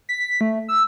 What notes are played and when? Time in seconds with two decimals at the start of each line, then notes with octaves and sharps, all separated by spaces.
0.09 B6
0.41 A3
0.68 E6